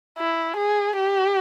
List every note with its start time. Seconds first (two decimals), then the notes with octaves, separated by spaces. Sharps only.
0.18 E4
0.56 G#4
0.96 G4